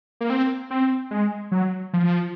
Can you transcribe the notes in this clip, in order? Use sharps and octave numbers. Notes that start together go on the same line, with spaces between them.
A#3
C4
C4
G#3
F#3
F3